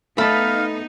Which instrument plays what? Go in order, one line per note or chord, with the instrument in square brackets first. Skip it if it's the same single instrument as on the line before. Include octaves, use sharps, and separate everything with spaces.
[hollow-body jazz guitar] A3 [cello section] B3 D#4 [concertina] F5 [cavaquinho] A5 B5